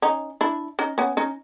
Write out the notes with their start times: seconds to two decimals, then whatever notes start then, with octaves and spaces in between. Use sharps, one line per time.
0.02 C#4 D#4
0.41 D4 E4
0.79 C#4 D#4
0.98 B3 C#4
1.17 C#4 D#4